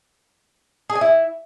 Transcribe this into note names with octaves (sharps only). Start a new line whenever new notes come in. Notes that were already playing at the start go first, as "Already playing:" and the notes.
G#4
G#5
E4